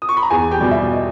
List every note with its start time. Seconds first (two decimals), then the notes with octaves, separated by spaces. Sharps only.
0.02 D#6
0.09 C#6
0.17 B5
0.23 A#5
0.30 E2 G#4 G#5
0.51 G4 G5
0.61 B2 G3
0.71 E5
0.92 D#5